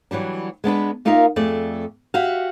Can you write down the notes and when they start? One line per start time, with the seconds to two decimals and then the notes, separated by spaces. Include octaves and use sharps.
0.11 E3 F#3 G3 D4
0.64 G#3 B3 D4 B4
1.05 A#3 D#4 F4 A#4 E5 F5
1.36 F2 A3 G#4 D5
2.14 F#4 G4 E5 F5